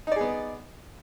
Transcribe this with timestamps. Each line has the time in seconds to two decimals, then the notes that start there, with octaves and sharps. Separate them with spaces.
0.07 D#4
0.12 D5
0.16 G#4
0.21 B3